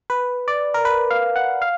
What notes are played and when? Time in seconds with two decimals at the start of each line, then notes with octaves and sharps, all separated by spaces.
0.10 B4
0.48 D5
0.74 A#4
0.85 B4
1.11 F5
1.36 F#5
1.62 F5